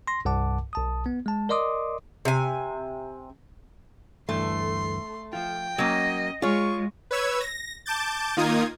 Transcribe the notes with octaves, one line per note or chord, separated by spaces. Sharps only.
C6 A#6
C2 G2 F#5 A5 D6
B1 A5 D#6
B3
G#3 A5
A#4 D5 D#5 C6 D6 D#6
C3 G#5
D2 G2 E3 A3 C6
F3 F4 G5
F#3 A#3 C#4 D#5
G#3 F4 G#4 C#5 C#6
B4 C#5 E6 G#6
A#6
A5 D6 G6 A6
D#3 A#3 D#4 F4 D#6 G#6